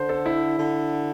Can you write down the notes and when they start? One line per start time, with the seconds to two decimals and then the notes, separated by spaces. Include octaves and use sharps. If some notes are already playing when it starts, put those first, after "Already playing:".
Already playing: D3 C5
0.09 A4
0.26 E4
0.59 D3